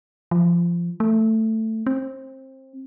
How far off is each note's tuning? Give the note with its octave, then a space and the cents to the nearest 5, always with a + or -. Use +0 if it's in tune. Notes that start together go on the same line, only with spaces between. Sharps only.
F3 -20
A3 +10
C4 +25